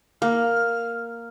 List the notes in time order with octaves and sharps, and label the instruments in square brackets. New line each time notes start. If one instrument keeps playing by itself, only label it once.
[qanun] A#3 [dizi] F6